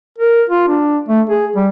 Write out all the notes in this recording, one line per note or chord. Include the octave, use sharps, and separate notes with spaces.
A#4
F4
D4
A3
G#4
G3